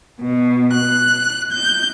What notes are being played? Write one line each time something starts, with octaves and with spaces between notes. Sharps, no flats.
B2
F#6
G6